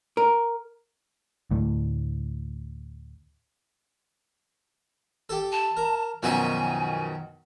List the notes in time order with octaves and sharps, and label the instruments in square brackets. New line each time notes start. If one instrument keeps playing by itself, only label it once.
[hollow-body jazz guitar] A#4
[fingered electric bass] D2 A2
[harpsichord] G4 A4
[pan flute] A5
[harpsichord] A#4
[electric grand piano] F#2 B2 F3 [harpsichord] D#3 F#4 E5 [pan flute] G#5